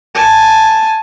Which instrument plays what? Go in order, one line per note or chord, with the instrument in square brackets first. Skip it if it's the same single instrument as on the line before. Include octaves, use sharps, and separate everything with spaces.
[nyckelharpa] G#5 A5